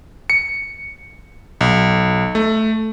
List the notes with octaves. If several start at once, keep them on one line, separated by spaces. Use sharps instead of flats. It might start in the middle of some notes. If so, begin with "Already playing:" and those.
C#7
B1
A3